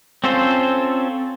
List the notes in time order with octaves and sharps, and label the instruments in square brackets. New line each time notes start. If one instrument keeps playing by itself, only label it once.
[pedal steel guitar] C4 C#4 F4 A4 C5